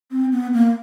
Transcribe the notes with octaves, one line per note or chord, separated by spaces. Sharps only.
C4
B3
A#3